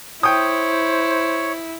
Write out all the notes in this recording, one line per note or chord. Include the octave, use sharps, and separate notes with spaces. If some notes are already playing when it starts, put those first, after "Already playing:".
E4 C5 C#5 G5 D#6